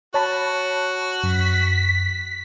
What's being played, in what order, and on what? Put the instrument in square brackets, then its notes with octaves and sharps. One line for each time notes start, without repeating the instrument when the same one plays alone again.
[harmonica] F#4 [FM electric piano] C#5 A5 B5
[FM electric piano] F#2 [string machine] B6